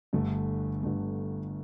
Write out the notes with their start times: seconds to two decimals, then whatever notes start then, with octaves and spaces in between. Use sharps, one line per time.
0.13 G1 G2 D3 A3
0.83 G1 G2 D3 A3